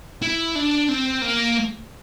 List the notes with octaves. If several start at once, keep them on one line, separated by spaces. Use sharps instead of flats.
E4
D4
C4
A#3